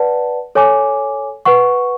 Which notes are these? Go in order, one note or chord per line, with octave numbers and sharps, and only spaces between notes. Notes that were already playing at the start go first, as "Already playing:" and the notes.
Already playing: B4 D5 F#5 A5
A4 C#5 G#5 D6
B4 F#5 C#6